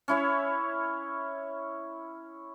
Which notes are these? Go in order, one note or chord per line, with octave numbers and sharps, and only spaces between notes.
C#4 E4 C#5